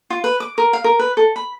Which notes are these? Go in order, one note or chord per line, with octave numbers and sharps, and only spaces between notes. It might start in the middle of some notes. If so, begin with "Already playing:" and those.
F4
B4
D6
A#4
F5
A#4
B4
A4
B5